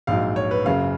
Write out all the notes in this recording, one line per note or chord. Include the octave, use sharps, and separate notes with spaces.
A#1 G#2 F#3 F5
C#5
B4
F#1 F#2 C#3 F5